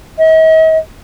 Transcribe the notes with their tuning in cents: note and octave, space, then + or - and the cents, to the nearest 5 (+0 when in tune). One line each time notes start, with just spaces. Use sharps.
D#5 +45